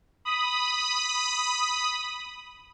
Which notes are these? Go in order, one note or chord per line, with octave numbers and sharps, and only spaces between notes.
B5 D#6